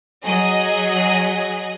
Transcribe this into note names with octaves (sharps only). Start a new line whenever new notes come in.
F#3 G#4 D#5